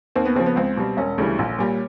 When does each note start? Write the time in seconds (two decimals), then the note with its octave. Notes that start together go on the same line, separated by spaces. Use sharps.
0.16 D#2 C4
0.25 B3
0.35 C#3 F3 C4
0.46 B3
0.56 C#2 C4
0.77 B2 G3
0.97 E1 C#4
1.18 D2 C#3 E3 G3
1.39 A#1
1.59 A#2 G3